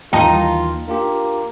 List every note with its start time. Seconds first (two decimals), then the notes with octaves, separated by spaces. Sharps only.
0.13 D#2 E3 A#3 D#4 F4 G5 A5
0.88 A#3 D4 F4 G4